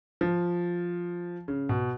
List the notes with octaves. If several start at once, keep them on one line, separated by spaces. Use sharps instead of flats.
F3
C#3
B2